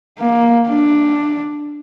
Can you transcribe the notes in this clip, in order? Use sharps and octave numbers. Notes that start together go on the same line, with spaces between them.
A#3
D4